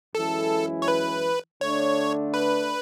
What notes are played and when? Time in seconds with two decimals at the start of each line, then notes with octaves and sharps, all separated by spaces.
0.15 F#2 E3 G#3 C#4 E4 A4
0.82 C#5
0.88 B4
1.61 D3 A3 D4 C#5
2.34 B4